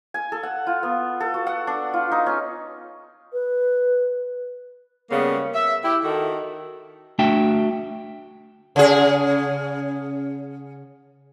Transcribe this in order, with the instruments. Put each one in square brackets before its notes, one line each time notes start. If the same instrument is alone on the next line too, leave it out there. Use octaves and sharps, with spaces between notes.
[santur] G#5
A4
F#5
F4
B3
A4
F#4
F#5
D4
F4
D#4
C#4
[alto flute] B4
[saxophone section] C#3 G3 G#3 A#3 B3
E5
E4 G4
D#3 F#4 A4
[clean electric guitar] A3 D4 F#4 E5 G5
[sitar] C#3 G#4